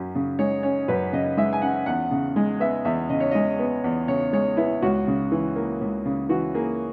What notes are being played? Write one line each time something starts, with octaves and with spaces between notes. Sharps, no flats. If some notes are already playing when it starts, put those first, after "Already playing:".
Already playing: F#2 C#4
C#3
G#3 C#5
C#4 C#5
F#2 B4
C#3 D#5
G#3 E5
G#5
C#4 F#5
E2 F#5
C#3
G#3
B3 E5
E2 E5
C#3 D#5
C#5
G#3 D#5
B3
E2
C#3 C#5
G#3 C#5
B3 E4
C#2 F#4
C#3
E3
A#3
C#2
C#3
E3 F#4
A#3 G#4